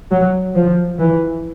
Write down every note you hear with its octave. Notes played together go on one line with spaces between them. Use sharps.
F#3
F3
E3